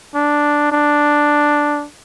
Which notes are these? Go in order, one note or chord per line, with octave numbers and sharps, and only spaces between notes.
D4
D4